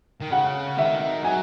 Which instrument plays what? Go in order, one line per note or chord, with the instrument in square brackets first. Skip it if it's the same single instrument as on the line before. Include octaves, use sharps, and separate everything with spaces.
[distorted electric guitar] D#3
[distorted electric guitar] C#3 [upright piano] F#5
[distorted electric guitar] D#3 [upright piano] E5
[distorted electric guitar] F#3 [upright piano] G#5